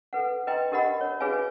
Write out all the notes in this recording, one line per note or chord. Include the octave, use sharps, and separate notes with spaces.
A4 B4 F#5
B4 D#5 G5 A#5 C6
D4 G4 A#4 D#5 F#5 B5
C#5
F#4 G#4 B4 C#5 F5 G#5